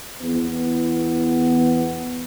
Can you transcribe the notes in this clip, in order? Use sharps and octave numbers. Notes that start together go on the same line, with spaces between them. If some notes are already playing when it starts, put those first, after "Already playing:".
E2 B3